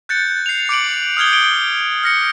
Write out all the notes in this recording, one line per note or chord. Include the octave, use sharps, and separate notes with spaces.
F#6 G6 A6 C#7
C7 F7
D6 C#7 D7 F#7
D#6 F6 G6 G#6 G7
D7 G7
F6 A#6 C#7